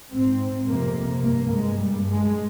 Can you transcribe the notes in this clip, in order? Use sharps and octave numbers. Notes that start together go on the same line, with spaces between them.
G#2 C4
F2 C3 A#3
G2 A#3
G#3
G2 G3
G#3